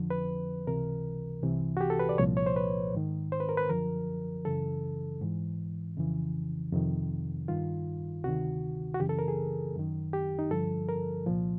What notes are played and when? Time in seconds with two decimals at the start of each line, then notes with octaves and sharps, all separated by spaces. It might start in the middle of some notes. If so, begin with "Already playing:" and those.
Already playing: F2 D3 F3
0.10 B4
0.67 C#2 C3 E3 A#4
1.43 C2 C3 E3
1.77 F#4
1.81 G4
1.90 A4
1.99 B4
2.09 D5
2.18 C2 A#2 F3 C#5
2.37 C#5
2.46 C5
2.56 B4
2.94 G#2 D#3
3.32 C5
3.40 B4
3.49 A#4
3.57 B4
3.69 F#2 D3 F3 A#4
4.45 F#2 C#3 E3 A4
5.21 G#2 E3
5.97 F2 C#3 E3
6.73 F2 C3 D#3
7.48 G2 D#3 F4
8.24 D2 C3 D#3 F#4
8.94 F#4
9.00 F#2 C#3 E3 G4
9.09 A4
9.19 A#4
9.28 G#4
9.75 F#2 D#3
10.13 G4
10.39 D#4
10.51 G2 D3 F3 A4
10.89 A#4
11.26 C2 A#2 F3